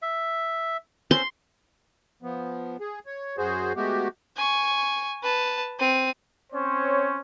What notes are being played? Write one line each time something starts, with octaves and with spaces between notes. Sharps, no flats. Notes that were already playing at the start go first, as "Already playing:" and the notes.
E5
C4 C#4 C5 C6
F3 B3
G#4
C#5
F#2 F#4 G#4 C5
G#3 A3 B3 F#4 G4
G#5 C#6
B4 A5
C4 D#7
C4 C#4 C5 C#5